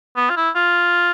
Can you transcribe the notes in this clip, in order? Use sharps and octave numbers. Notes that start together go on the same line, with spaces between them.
B3
F4
E4
F4